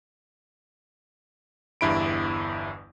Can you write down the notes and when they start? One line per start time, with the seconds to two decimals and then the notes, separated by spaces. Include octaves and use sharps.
1.81 G1 E2 G2 E4 B5 D7